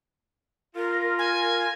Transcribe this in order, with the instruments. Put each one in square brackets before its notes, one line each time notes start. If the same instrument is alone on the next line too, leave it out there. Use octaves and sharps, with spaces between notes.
[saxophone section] F4 [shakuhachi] A#4
[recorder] G#5